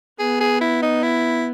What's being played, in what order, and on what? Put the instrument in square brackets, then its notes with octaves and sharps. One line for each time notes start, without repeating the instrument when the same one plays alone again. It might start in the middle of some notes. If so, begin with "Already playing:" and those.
[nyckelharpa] B3 [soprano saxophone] G#4
[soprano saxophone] G#4
E4
D#4
E4